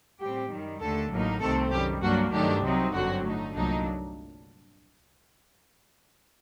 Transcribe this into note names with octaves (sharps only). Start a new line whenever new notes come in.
A2 G3 C4 G4
F#2 D#3 G3
D#2 D3 A3 A4
A1 A2 F#3 A#3 D#4
C2 C3 D#3 A3 C4 A4
F#2 D#3 G3 G4
G2 F#3 A#3 D4 F#4
G2 D#3 F#3 A3 D4 G4
C2 C3 F#3 C4 D#4
G1 F#2 D3 F#3 C4 F#4
A2 A3 D#4
C2 A#2 F#3 A3 D4 D#4